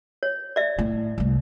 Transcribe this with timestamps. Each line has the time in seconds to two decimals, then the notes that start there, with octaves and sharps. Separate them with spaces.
0.23 C#5
0.56 D5 E5
0.79 A2
1.18 C2 A3